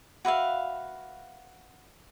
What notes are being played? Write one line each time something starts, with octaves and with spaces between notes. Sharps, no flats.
F#4 B4 E5 F5